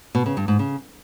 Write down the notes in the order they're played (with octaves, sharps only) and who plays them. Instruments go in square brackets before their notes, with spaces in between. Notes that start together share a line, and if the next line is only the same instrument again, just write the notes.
[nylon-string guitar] B2
C#3
G2
G#2
C#3